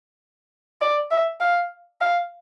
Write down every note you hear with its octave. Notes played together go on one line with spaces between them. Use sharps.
D5
E5
F5
F5